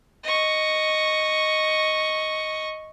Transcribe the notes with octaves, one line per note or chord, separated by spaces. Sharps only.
D#5 C#6